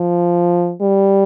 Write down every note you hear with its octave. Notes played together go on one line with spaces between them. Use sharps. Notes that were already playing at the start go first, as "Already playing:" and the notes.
Already playing: F3
G3